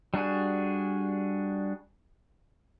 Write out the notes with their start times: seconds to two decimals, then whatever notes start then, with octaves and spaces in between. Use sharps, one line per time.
0.14 G3 D4 F#4 G#4